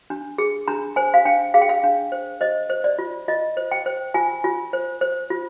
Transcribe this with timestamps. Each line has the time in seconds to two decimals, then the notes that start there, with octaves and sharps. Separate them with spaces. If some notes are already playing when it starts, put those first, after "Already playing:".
0.10 D4
0.38 G#4
0.68 D4 A#5
0.96 C5 G#5
1.14 F5
1.25 D4 G5
1.54 G#4 F5
1.62 G5
1.69 F5
1.84 D4
2.12 C5
2.41 C5 D#5
2.70 C5
2.84 D5
2.99 F4
3.28 F4 D#5
3.57 C5
3.71 G5
3.86 C5
4.14 F4 G#5
4.44 F4
4.73 C5
5.01 C5
5.30 F4